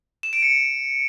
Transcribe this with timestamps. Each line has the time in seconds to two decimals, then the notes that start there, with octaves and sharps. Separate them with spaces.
0.23 E7
0.33 D7
0.42 C#7